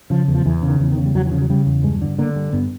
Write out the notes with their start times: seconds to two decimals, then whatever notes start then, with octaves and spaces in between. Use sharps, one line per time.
0.10 C#3 F3
0.28 E2
0.35 F3
0.46 E2 E3
0.62 C#3
0.68 D#3
0.80 E2 E3
0.92 D#3
0.97 C#3
1.06 G3
1.15 E2 F#3
1.26 E3
1.32 C#3 F3
1.42 F#3
1.50 C#3 G3
1.66 E2
1.83 G2 G#3
2.02 D3
2.18 D3 A#3
2.35 G2
2.53 G2 B3